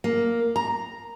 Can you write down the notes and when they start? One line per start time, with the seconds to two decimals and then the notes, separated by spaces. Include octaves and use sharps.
0.04 A#3
0.56 A#5